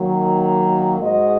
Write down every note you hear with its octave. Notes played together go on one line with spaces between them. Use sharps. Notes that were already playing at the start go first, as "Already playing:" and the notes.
Already playing: D#3 F#3 A#3
G#2 G#3 F#4 D#5